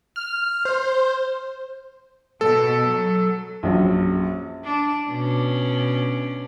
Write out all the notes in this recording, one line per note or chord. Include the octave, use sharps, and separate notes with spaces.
F6
C5
B2 A4
F#3
A#1 F#2
D4
B2 C#4 D4